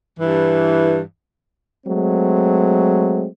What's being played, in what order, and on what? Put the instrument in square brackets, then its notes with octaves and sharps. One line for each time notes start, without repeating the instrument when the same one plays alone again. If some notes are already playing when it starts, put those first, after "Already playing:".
[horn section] G2 E3
[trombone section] F#3 G#3 A3 C4